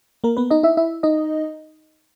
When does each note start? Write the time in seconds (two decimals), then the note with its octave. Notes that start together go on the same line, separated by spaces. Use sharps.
0.24 A#3 A#4
0.37 B3 B4
0.51 D#4 D#5
0.63 E4 E5
0.77 E4 E5
1.03 D#4 D#5